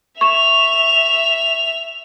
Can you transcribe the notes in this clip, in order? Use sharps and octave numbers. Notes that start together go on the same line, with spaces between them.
E5 C#6 E7 F7